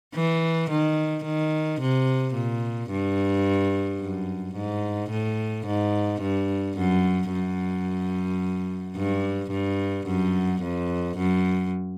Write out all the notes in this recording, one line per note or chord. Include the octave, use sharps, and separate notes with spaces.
E3
D#3
D#3
C3
A#2
G2
F#2
G#2
A2
G#2
G2
F#2
F#2
G2
G2
F#2
F2
F#2